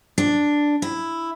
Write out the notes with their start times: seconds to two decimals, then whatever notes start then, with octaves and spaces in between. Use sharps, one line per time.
0.18 D4
0.82 E4